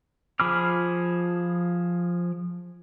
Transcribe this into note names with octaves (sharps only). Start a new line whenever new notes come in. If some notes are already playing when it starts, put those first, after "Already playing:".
F3 G#4 B5 D6 F6